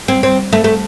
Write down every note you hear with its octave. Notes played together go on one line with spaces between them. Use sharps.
C4
C4
A3
A3